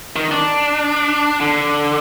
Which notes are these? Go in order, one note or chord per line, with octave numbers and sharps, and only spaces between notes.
D#3
D4
D3